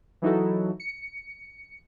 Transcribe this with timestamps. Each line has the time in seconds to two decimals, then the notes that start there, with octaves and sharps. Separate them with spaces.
0.22 E3 F#3 D#4 E4 F#4 A4
0.80 C#7